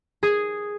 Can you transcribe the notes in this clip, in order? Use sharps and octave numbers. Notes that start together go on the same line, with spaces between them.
G#4